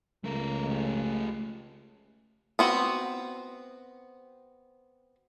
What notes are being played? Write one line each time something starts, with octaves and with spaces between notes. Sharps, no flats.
C#2 A3 A#4
A3 G4
B3 C4 F#4